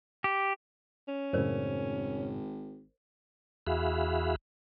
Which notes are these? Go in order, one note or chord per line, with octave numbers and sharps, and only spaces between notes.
G4
C#4
G#1 F#2 A2 C#3 A#4 C5 D5
E2 F#4 G#4 E5 F5 B5